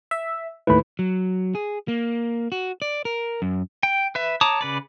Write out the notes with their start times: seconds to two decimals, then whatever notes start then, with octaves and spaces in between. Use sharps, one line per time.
0.11 E5
0.67 D#2 A2 E3 B4 B5
0.99 F#3
1.55 G#4
1.88 A#3
2.52 F#4
2.82 D5
3.05 A#4
3.42 F#2
3.83 G5
4.15 B4 E5
4.41 C#5 A5 A#5 D6 D#6
4.61 C#3 B4 D5